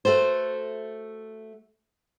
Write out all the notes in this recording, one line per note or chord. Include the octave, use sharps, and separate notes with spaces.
A3 F#4 A4 C5